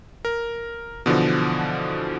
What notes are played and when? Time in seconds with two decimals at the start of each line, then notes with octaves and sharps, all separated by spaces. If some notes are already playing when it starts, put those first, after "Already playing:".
0.25 A#4
1.06 B2 D3 E3 F3